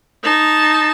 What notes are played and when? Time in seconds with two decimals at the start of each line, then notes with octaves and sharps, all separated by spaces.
0.24 D#4 A5